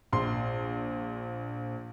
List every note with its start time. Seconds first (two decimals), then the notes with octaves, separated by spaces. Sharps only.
0.13 A#1 C6